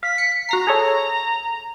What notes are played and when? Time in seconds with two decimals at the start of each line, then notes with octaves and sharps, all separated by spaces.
0.03 F5 B6
0.18 C#7
0.49 F#4 A#5 A#6 C7
0.67 G#4 A4 C#5